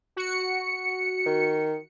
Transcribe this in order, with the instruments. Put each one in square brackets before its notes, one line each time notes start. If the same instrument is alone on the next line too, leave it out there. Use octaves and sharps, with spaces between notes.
[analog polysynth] F#4 C#7
[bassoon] D#3